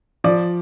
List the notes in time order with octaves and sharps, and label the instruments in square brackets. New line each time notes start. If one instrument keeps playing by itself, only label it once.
[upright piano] F3 D5